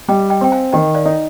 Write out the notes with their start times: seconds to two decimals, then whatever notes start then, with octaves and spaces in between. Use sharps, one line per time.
0.08 G3 D#5 G5
0.30 D#5 G5
0.41 C4 G5
0.52 F5 G#5
0.73 D#3 D#5 G5
0.95 D5 F5
1.06 D#4